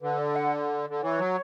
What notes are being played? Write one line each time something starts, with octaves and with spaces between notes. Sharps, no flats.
D3 B4
D5
F#5
D3
E3 C#5
F#3